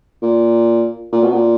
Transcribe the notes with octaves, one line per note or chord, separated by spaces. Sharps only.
A#2
A#2
B2
A#2